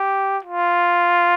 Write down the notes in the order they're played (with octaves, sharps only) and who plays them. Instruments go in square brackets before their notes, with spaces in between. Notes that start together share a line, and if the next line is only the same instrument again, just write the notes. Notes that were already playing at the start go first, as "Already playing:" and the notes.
Already playing: [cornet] G4
F4